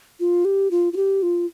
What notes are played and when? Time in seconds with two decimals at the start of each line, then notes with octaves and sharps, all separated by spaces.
0.20 F4
0.45 G4
0.71 F4
0.93 F4
0.96 G4
1.23 F4